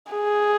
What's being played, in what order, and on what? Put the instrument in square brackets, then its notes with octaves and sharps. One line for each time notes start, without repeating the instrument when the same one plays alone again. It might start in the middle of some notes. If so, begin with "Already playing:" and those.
[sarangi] G#4